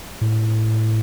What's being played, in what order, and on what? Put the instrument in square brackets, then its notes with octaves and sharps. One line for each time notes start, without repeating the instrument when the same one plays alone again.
[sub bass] A2